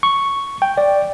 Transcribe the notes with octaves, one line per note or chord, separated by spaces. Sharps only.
C#6
G5
D5